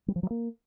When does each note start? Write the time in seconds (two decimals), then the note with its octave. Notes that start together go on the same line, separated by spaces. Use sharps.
0.08 G3
0.16 F3
0.23 F#3
0.30 A#3